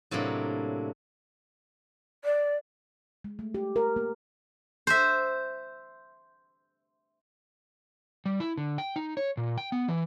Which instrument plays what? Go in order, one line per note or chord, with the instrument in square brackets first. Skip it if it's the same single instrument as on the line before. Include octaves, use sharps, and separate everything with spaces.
[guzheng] A2 C3 F#3 A#3 D4
[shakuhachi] D5
[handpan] G#3
A3
G4
A#4
A#3
[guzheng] C5 E5
[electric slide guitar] G3
E4
D3
G5
D#4
C#5
A#2
G5
B3
E3